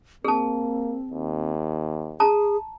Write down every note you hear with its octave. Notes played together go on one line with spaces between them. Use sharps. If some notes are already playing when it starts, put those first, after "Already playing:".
A#3 C4 G#4 A5
D#2
G#4 A5 A#5